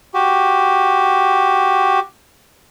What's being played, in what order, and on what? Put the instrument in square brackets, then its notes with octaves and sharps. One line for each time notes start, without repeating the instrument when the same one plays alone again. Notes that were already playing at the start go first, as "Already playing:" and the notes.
[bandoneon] F#4 G4